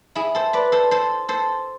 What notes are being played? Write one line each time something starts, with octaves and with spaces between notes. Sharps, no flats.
E4 G#4
A4 C5
B4 D5
A4 C5
A4 C5
A4 C5